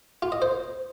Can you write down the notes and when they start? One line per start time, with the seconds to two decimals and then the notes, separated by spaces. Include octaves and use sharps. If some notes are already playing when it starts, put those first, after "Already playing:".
0.22 F4
0.32 D#5
0.42 C5